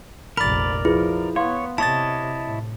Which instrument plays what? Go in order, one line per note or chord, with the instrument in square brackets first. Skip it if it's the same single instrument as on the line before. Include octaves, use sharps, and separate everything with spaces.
[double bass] F1 A#1 [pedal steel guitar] A#4 D5 [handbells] B5 A6
[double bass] F3 [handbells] E4 [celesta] F4 G#4 B4
[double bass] B3 [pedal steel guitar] C#5 [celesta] F5 C6
[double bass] C3 [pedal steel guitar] E4 C#5 D#5 [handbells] A5 A6
[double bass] A2